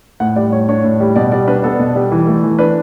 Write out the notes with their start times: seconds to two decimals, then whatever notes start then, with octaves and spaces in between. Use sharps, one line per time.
0.20 A2 F#5
0.36 G3 D5
0.52 A2 C#5
0.69 D4 C#5
0.84 A2
1.00 G3
1.16 B2 D5
1.32 G3 D5
1.47 D4 B4
1.64 B3 A4
1.79 B2
1.95 G3
2.12 E3
2.27 A3
2.43 E3
2.59 D4 B4